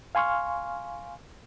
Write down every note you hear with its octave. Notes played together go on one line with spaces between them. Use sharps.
F5 G#5 C6 C#6 F6